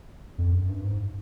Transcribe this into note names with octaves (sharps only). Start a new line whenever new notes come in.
F2
F#2
G2
G#2